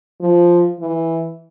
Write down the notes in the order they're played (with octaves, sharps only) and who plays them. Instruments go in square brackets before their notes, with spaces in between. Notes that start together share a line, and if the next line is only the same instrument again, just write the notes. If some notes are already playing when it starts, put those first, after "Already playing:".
[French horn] F3
E3